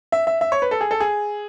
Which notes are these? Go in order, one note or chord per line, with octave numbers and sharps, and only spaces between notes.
E5
E5
E5
C#5
B4
A4
G#4
A4
G#4